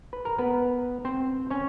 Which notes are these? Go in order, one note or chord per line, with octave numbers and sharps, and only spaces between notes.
B4
A#4
B3 B4
C4 C5
C#4 C#5